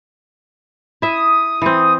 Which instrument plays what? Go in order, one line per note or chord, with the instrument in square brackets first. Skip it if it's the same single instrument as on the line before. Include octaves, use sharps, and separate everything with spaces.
[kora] E4 E5 [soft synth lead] D#6
[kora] E3 C4